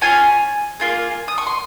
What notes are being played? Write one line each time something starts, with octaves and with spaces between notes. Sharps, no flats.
C#4 F4 G#4 G#5
A#3 F4 G#4
D#6
C#6
C6